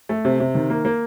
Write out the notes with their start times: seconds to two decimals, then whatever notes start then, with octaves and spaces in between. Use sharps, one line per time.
0.09 A3
0.25 C3
0.40 C3
0.55 D#3
0.70 A#3
0.85 A#3